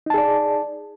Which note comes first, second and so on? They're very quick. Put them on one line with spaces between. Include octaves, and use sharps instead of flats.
D#4 A5 G#4 D5